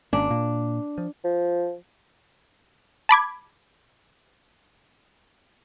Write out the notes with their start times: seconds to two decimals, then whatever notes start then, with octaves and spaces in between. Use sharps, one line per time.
0.13 G#1 A#3 C#4 D4
0.30 A#2 A#3
0.98 F3
1.25 F3
3.09 A5 B5 D6 G#6